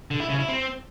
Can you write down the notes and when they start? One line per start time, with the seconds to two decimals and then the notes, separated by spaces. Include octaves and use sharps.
0.11 D3
0.20 E4
0.29 C#3
0.39 E4
0.48 C4